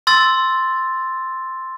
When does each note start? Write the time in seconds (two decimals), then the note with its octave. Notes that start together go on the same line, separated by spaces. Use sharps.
0.07 C6 E6 A6